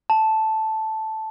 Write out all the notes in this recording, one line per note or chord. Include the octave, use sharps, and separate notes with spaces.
A5